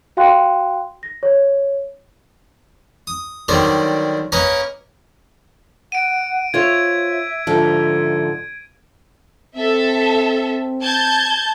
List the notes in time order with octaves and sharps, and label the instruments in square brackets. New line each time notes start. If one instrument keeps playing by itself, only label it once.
[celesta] F#4 F5 G5 C6 F#6
A#6
C#5
[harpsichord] D#6
D3 D#3 F#3 G3 C5 D5
A#3 C#4 A#4 B4 D#5
[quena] F#5 [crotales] D7 D#7
[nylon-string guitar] F4 C5 C#5 [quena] E5 [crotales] G#6
[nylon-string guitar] G#2 D3 F3
[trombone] C4 [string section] A4 E5
[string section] A5 G6 G#6